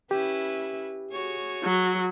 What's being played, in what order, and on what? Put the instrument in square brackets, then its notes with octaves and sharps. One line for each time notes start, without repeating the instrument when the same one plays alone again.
[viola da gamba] C#4 E4 B4 [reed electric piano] G4
[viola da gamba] F#4 G#4 C#5
[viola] F#3